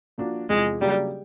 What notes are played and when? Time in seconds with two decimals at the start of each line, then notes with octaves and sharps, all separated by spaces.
0.18 F3 A#3 D4 F#4
0.50 E2 C3 F3 G#3
0.81 C#3 F#3 G3 A#3 D4 G4